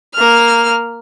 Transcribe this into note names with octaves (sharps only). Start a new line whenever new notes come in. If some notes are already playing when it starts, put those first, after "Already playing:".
A#3 F6